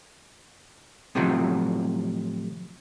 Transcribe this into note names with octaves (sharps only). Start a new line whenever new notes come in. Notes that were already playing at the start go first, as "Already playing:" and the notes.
A2 C3 D#3 F3 F#3